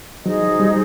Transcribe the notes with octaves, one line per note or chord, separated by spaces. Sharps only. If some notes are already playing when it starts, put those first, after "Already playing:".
F#3 D#4 G#4 C5 D#5
F#3
G3